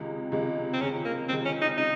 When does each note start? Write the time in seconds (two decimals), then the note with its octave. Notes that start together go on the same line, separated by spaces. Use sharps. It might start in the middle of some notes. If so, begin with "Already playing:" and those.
Already playing: C#2 C3 D#3 G#3
0.32 C#2 C3 D#3 G#3
0.73 C4
0.81 C#2 C3 D#3 G#3 C#4
1.05 A#3
1.29 C#2 C3 D#3 G#3 C4
1.46 C#4
1.62 D#4
1.78 C#3 G#3 C#4 D#4